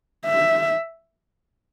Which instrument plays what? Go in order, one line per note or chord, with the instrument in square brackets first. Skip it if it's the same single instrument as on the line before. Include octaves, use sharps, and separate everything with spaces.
[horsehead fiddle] E5